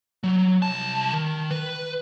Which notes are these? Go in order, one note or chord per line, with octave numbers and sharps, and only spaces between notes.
F#3
C2 A5
D#3
B4